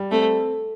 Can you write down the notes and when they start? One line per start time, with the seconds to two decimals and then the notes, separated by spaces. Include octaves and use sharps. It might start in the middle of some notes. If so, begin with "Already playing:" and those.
Already playing: G3
0.12 A3 C4